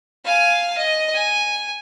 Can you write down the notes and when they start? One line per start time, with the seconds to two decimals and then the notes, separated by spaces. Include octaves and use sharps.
0.25 F5 G#5
0.78 D#5
1.14 G#5